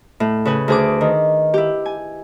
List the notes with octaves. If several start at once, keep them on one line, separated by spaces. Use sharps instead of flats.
A2
C#3 B4 G#5
D2 G#4 D6
D#3
E4 G4
G#5